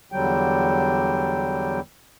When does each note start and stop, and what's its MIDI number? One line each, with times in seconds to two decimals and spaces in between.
0.12 1.80 40
0.12 1.80 50
0.12 1.80 54
0.12 1.80 55
0.12 1.80 79